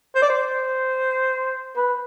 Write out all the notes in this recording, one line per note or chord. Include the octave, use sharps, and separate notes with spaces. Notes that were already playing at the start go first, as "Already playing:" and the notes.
C5
D5
C5
B4